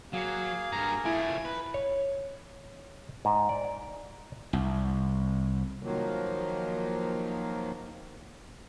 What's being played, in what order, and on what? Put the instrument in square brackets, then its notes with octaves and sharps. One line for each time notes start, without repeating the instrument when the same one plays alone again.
[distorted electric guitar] F#3 [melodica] A#3 G#4 [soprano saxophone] F5
[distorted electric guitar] G2 A#4 [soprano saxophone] A#5
[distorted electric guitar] F3 A3 [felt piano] E4 D7 [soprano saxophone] G#5
[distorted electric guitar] B4
[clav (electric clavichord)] C#5
G#2
D5
[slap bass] C2
[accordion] D#3 F3 F#3 A#3